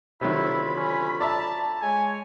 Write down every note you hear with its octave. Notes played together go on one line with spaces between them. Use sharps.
D2 C3 D#3 F#3 E4 F4 B5
C#4
D5 E5 A5 A#5
G#3 C#5 G#5